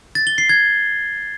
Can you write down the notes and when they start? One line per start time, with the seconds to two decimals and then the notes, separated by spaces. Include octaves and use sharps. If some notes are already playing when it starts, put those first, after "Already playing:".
0.15 A6
0.27 G7
0.38 C7
0.49 G#6